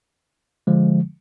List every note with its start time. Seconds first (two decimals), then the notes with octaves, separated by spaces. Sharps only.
0.67 D3 F3 G#3